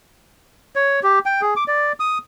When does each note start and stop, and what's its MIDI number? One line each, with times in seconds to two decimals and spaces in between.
0.76 1.00 73
1.03 1.19 67
1.26 1.41 79
1.41 1.54 68
1.56 1.64 86
1.68 1.92 74
2.00 2.18 87